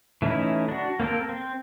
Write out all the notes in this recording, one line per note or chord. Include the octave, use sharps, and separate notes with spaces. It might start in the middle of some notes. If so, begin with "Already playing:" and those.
E3 A3 C#4 D#4 E4
D4 F#4
A#3 C4 A4 A#4
C4